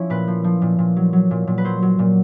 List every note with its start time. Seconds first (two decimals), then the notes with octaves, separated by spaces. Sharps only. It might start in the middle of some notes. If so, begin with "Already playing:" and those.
Already playing: F3 C#4 E4
0.10 A#2 B4
0.28 F3
0.44 F3
0.62 A#2
0.79 A#2
0.96 F#3
1.13 F#3
1.31 A#2
1.47 A#2
1.58 B4
1.65 F#3 C5
1.82 F#3
1.99 A#2